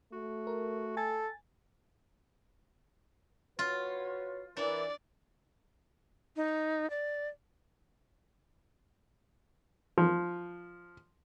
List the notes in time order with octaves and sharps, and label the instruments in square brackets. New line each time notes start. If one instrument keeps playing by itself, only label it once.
[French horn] A3 [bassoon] F#4
[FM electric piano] A#4
[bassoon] A4 [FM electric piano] G#5 A6
[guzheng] F4 [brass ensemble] F#4 B4 C#5
[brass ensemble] E3 A#4 [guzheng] D4 [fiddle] D5
[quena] D#4
D5
[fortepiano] F3